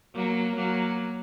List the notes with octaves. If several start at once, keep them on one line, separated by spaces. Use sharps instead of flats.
F#3 A#3
F#3 A#3